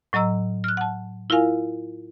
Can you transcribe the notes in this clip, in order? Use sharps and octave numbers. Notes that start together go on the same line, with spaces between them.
A2 F#3 D#5 A#5 E6
F6 F#6
F#5 A5
E4 F4 A#4 F5 G#5